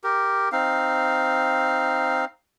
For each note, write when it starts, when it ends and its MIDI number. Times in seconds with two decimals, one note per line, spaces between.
0.04 0.49 67
0.04 0.49 70
0.52 2.25 60
0.52 2.25 63
0.52 2.25 77